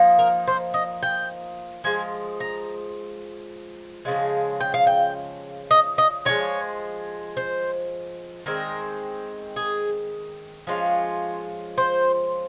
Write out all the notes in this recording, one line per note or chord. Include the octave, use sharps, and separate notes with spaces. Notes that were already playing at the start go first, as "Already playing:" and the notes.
Already playing: F3 A#3 D#4
A#4
C5
D#5
G5
F3 G#3 G#5
A#5
C#3 F3 G#3
G5
F5
G5
D#5
D#5
F3 G#3 D#4 C#5
C5
D#3 G#3 C4 A#4
G#4
F3 G#3 C#4 F4
C5